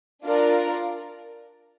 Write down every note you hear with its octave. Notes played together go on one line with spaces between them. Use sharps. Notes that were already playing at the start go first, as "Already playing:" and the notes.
D4 F4 A#4 D5